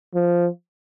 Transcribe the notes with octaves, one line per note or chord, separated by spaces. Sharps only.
F3